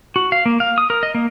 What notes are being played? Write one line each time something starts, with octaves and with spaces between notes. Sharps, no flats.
F#4
F5
A#3
F5
D#6
A#4
D#5
A#3